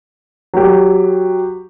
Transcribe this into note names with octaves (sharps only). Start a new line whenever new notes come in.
F#3 G4